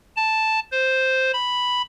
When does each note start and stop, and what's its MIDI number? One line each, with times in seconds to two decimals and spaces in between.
0.16 0.59 81
0.72 1.32 72
1.33 1.82 83